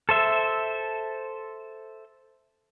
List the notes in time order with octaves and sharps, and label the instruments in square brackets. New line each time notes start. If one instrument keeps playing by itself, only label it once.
[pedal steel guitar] A4 C5 E5